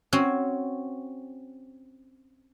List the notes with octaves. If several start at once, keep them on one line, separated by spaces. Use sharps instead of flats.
C4 C#4 F#4